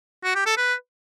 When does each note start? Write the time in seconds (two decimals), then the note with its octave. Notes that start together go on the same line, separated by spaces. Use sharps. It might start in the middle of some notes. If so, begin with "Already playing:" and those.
0.24 F#4
0.35 G4
0.46 A4
0.57 B4